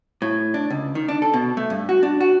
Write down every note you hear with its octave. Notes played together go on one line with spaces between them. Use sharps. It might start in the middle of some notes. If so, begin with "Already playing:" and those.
A2
D4
C#2
D#3
D4
A4
B2
A3
G2
F#4
D4
F#4